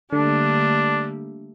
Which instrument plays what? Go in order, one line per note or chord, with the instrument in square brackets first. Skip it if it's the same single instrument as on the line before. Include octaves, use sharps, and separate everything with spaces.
[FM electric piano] D3 [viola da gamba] G3 A3 A#3 [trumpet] D4